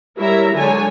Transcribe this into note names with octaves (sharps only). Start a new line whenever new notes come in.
G3 E4 A#4 C#5 E5 A#5
D3 F#3 G#3 C#5 G#5 A5